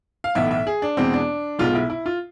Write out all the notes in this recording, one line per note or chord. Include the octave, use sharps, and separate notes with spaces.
F5
B1 A2 E3 B3 E5
E5
G#4
D4
E2 B2 G#3 B3 C4
D4
B1 B2 G#3 B3 F4
E4
E4
F4